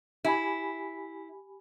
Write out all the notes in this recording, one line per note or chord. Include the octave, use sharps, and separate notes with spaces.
E4 G4 G#5 B5